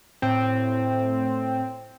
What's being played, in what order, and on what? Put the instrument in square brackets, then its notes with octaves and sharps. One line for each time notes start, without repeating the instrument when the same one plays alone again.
[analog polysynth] A2 C4